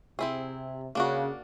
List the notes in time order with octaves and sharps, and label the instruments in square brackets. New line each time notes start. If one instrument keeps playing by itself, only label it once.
[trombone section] C3 [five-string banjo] C4 E4 G#4
[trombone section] C#3 [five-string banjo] A#3 D4 F#4